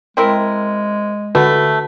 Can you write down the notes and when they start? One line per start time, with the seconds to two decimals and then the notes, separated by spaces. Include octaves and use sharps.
0.17 G#3 C4 E4 A#4
1.35 D3 A3 F#4 B4